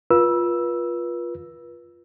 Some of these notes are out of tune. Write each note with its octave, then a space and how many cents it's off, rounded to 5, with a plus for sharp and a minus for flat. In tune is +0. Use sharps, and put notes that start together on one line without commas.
F4 +0 B4 -35 E6 +0